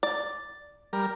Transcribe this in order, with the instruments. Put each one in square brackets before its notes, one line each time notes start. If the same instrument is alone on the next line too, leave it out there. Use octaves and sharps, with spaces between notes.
[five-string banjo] D5
[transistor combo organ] G3 A#4